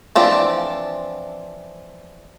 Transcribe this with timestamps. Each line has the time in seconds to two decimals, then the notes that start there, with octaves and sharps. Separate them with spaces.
0.15 E3 F3 C4 D4